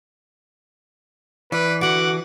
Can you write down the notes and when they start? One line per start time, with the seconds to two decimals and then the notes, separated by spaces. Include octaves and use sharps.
1.52 E3 B4 D5
1.81 D3 F#4 F#5 D6